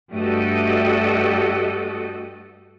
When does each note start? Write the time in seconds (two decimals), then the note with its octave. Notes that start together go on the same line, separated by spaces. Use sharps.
0.12 G2 A3 F#4 G4 A4 D#5